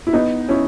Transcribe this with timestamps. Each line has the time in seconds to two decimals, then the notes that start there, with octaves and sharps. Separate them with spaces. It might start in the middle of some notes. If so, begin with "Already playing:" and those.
0.07 E4
0.13 B3 D#4
0.49 C#4 E4